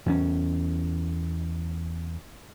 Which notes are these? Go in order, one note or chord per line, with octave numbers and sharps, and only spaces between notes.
E2 C#4